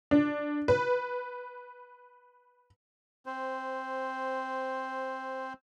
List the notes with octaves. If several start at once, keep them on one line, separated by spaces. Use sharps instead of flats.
D4
B4
C4 C5